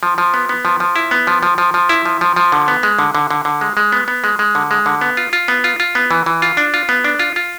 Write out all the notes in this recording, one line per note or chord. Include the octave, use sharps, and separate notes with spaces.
F3
F3
B3
B3
F3
F3
E4
B3
F3
F3
F3
F3
E4
F3
F3
F3
D3
B3
G#3
D3
D3
D3
D3
G#3
G#3
B3
B3
G#3
G#3
D3
G#3
D3
B3
F4
F4
B3
F4
F4
B3
E3
E3
F4
D4
F4
B3
D4
F4
F4